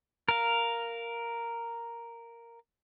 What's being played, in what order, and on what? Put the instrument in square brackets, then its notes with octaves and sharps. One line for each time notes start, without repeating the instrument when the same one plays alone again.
[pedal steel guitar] A#4 F5